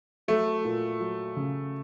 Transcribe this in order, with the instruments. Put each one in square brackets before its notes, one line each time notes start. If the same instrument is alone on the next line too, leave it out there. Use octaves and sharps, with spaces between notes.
[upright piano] F#3 [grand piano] A3
[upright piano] A#2
F#3
C#3